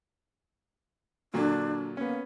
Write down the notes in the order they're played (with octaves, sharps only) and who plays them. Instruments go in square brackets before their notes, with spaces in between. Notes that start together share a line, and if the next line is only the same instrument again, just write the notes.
[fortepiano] A#2 D3 F#3 [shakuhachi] D4
[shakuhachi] A#3 [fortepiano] B3 C#4